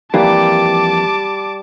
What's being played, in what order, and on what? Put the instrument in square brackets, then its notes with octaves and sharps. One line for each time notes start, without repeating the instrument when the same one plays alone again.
[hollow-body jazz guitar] F2 E3 A#3 [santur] G3 [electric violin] A5 D6